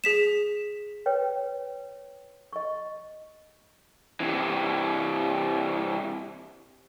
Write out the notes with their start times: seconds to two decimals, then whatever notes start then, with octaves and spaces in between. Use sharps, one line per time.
0.04 G#4 B6 E7
1.06 B4 C#5 G5
2.53 D#5 C#6
4.20 C3 E3